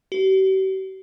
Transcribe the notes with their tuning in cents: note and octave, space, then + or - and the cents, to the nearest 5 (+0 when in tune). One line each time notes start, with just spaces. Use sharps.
G4 -45